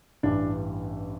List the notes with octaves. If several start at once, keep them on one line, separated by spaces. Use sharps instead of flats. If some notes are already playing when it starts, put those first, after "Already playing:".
A1 G2 E3 D4